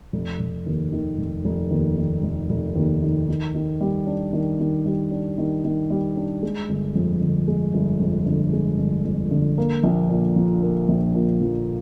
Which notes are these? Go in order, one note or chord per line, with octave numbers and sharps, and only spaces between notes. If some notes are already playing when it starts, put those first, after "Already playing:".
F1
F1
D#2
D#3
F1
F1
D#2
D#3
F1
F1
D#2
D#3
D#3
D#3
G3
D4
D#3
D#3
G3
D4
D#3
D#3
G3
D4
G#3
G1
F2
D3
G#3
G1
F2
D3
G#3
G1
F2
D3
A#3
A#1
A#2
F3
A#3
A#1
A#2
F3